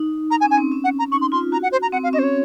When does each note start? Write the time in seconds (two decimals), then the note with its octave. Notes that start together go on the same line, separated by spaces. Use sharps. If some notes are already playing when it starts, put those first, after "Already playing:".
Already playing: D#4
0.31 A#5
0.41 G#5
0.44 C#4
0.51 G#5
0.58 C4
0.72 C#4
0.84 F#5
0.99 A#5
1.12 D#4 C#6
1.21 C6
1.32 F4 C6
1.52 F#4 A#5
1.63 F#5
1.72 C5
1.82 A#5
1.92 C4 F#5
2.03 F5
2.13 C#4 D#5
2.19 C5
2.23 C#5